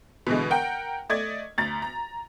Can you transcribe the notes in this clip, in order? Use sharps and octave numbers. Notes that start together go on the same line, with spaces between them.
B2 D3 E3 G#3
A#4 F#5 G5
A3 D5 D#5 G#6
D2 A#5 A6
A#5